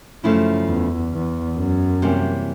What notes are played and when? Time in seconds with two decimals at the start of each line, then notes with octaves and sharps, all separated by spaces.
0.23 F#2 C#3 F3 A3 C#4 E4
0.68 E2
1.13 E2
1.57 F#2
2.02 C3 E3 G3 A#3 C#4